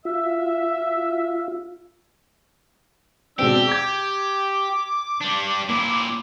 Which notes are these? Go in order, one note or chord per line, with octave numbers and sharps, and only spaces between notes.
F4 E5
B2 G#3 C4 D4 G4 E6
D6 G6 G#6
G3 D4
A#2 A#3 E4